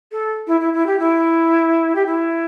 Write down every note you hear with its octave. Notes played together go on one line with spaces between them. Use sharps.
A4
E4
E4
E4
G4
E4
G4
E4